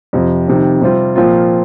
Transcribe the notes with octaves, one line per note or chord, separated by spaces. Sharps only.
F2 C3 F3
F2 C3 D#3
C3 G3 C4 F4
A#2 F3 C4 F4